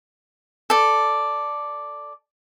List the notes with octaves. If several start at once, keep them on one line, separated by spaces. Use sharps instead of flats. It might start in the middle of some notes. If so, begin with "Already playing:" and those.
A4 D5